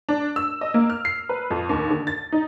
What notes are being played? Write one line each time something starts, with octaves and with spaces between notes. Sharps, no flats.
D4
E6
D#5
A#3
F6
C7
B4
F2
D#2
D3
A6
D#4